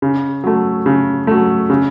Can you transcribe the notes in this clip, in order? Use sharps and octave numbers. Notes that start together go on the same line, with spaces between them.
C#3
F#3 A3
C#3
F#3 A3
C#3